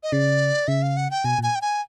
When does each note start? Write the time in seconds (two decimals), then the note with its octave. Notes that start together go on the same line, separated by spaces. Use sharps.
0.03 D#5
0.12 C#3 D5
0.68 C#3 E5
0.82 F5
0.97 F#5
1.11 G5
1.24 B2 G#5
1.39 A#2 G#5
1.55 G5
1.62 G#5